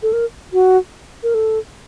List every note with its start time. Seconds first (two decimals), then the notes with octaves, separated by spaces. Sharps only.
0.03 A4
0.13 A#4
0.53 F#4
1.23 A#4
1.34 A4